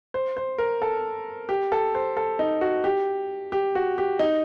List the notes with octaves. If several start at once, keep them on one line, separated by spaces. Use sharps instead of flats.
C5
C5
A#4
A4
G4
A4
C5
A4
D#4
F#4
G4
G4
F#4
G4
D#4